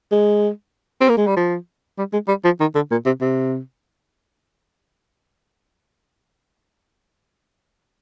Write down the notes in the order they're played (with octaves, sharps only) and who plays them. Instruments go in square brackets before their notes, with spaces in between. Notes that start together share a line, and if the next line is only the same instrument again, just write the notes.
[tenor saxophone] G#3
C4
A#3
G#3
G3
F3
G3
G#3
G3
F3
D#3
D3
A#2
C3
C3